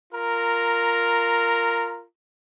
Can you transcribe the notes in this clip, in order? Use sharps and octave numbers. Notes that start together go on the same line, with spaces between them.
F4 A#4 A#5